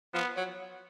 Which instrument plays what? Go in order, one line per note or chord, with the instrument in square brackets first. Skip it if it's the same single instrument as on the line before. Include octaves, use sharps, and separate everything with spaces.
[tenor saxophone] F3 [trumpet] B3
[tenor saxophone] F#3